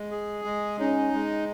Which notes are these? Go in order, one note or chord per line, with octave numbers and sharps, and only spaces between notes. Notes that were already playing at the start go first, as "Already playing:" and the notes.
Already playing: G#3
G#4
G#3
C#4 D#4
G#3